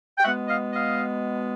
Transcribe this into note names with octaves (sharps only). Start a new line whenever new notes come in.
G5
B2 G#3 B3 E5 F#5
D#5 F5
D#5 F5